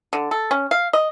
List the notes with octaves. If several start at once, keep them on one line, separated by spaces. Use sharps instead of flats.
D3
A4
C#4
F5
D#5